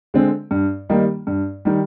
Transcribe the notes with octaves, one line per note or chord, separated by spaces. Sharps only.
D3 G#3 C4
G2
D#3 G3 A#3 D#4
G2
D#3 G3